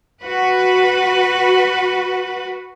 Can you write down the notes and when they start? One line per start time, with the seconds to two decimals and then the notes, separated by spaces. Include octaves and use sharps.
0.23 F#4 B4